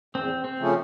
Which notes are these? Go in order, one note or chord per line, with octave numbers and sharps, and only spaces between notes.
E2 C4
C4
C#3 F3 A3 C#4